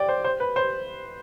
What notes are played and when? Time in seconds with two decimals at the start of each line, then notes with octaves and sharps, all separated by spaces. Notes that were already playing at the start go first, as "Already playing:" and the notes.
Already playing: D5 G5
0.09 C5
0.24 C5
0.40 B4
0.56 C5